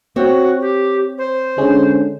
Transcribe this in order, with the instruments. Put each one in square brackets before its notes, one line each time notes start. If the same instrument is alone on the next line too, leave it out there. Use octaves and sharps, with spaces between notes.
[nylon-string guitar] C4 C#5 [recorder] F#4
[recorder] G4
C5
[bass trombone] D3 [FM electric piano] G#3 C#4 G#4